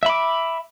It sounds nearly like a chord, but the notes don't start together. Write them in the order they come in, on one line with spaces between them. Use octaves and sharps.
E5 B5 D6